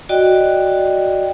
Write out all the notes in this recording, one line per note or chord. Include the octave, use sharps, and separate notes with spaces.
F#4 D5 D#5 G5